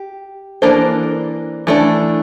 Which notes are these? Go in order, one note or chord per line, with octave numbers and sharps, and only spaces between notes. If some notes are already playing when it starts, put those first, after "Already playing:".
Already playing: G4
E3 A#3 D4 A4 C5
E3 A3 D4